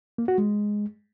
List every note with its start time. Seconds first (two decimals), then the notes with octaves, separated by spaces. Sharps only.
0.18 A#3
0.28 F#4
0.38 G#3